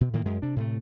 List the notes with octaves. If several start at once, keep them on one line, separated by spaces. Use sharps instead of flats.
B2
A2 D#3 E3 A#3
F#2 G#3
C3 D4
A2 C3 A3